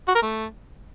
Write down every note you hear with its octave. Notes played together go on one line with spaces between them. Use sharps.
F#4
A#4
A3